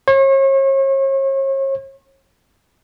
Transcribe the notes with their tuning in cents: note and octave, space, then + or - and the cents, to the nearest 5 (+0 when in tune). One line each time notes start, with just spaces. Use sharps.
C#5 -40